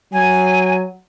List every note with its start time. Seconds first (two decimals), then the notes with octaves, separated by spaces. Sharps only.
0.13 F#3 G#5